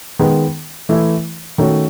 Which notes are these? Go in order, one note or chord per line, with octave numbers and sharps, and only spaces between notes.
D#3 G#3 B3
E3 A3 E4
D#3 A3 C#4 F#4